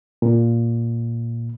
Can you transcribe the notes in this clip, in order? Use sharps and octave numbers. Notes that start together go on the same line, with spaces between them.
A#2